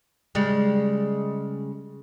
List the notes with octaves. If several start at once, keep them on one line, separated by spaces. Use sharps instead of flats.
C#3 G3 G#3